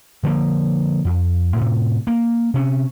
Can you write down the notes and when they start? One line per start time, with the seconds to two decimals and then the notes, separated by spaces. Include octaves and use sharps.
0.23 D3 F3 G#3 A#3
1.05 F2
1.56 A2 C3
2.07 A#3
2.54 C3 C#4